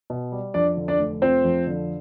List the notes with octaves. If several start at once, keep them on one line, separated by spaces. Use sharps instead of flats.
B2
G3
F2 D4 D5
D3
D4 D5
F1
F3 C4 C5
F2
D3